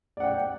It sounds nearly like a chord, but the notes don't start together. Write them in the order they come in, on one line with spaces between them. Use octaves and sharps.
D5 F#5 G5